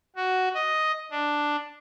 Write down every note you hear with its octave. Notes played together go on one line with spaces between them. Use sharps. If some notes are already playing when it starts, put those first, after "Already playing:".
F#4
D#5
D4